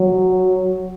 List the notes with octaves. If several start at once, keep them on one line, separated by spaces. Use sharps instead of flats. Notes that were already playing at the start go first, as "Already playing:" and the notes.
Already playing: F#3